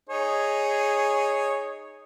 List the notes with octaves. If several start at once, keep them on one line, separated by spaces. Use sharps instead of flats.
D#4 G#4 C#5